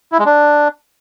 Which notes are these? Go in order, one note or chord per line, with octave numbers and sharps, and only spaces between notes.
E4
G#3
D4